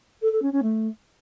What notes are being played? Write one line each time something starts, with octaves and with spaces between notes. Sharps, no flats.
A4
A4
C#4
C#4
A3